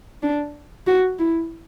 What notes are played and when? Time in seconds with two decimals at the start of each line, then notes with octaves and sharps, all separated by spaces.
0.23 D4
0.87 F#4
1.19 E4